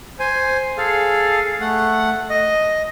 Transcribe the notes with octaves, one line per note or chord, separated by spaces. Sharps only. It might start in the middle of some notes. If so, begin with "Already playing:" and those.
C5 G#5
G#4 A4 F5
A3 F#5
D#5